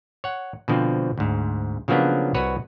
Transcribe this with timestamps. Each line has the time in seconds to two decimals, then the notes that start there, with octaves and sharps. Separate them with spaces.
0.24 C#5 F#5
0.68 B2 D3 F3 C4
1.18 D2 G#2
1.88 C#3 F3 F#3 A#3 B3 D4
2.34 C2 F#4 B4 C#5